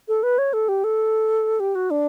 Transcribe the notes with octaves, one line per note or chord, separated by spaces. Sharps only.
A4
B4
C#5
A4
G4
A4
G4
F#4
D4